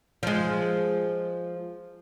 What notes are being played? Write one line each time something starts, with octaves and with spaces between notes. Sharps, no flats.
F3 G#3